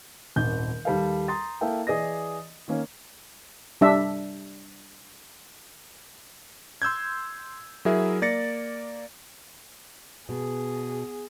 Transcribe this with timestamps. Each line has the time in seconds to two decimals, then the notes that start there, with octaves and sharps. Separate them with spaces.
0.36 D#1 G#1 G6
0.85 D#2 G3 A4 F5
1.28 A#5 C6 D#6 A6
1.61 A#3 E4 A4 F5 G5
1.87 E3 G#4 D5 D#5 A#6
2.68 D#3 A#3 C#4
3.81 G3 D4 E5
6.82 C6 E6 G6 G#6
7.85 F#3 E4 G#4 A#4 E5
8.22 A#3 D5 A6 A#6 C#7
10.29 B2 G#4